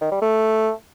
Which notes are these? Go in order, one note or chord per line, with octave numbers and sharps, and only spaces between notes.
D#3
G3
A3